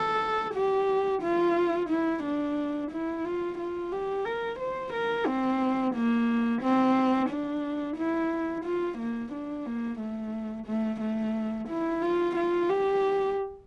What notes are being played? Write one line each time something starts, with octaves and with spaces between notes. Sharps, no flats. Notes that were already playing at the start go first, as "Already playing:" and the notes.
Already playing: A4
G4
F4
E4
D4
E4
F4
F4
G4
A#4
C5
A#4
C4
A#3
C4
D4
E4
F4
A#3
D4
A#3
A3
A3
A3
E4
F4
F4
G4